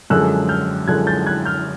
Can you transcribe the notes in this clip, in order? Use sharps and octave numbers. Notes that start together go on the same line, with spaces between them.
F#2 D3 F3 G#3 E6 F#6
F6 G6
F#2 D3 F3 G#3 F#6 G#6
G6 A6
F#6 G#6
F6 G6